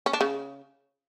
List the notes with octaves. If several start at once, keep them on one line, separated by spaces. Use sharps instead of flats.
C#4
D4
C#3